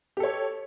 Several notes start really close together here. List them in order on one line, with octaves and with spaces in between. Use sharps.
G4 A4 C#5